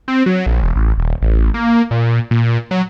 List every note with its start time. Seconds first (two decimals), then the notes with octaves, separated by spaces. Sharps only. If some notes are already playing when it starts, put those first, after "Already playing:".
0.08 C4
0.26 F#3
0.46 A#1
0.63 E1
0.76 A1
0.98 D#1
1.22 A1
1.54 A#3
1.91 A#2
2.31 A#2
2.71 F#3